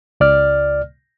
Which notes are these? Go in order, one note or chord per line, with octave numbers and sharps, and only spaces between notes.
C#2 D5 F6